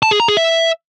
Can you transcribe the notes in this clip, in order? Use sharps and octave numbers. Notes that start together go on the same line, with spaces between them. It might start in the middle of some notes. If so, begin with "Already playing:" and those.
A5
G#4
A#5
G#4
E5